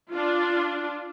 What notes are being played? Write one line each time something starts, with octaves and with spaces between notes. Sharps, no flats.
D4 F4